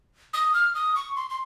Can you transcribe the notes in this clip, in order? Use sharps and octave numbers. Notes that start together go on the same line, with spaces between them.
D#6
F6
D#6
C#6
C6
C6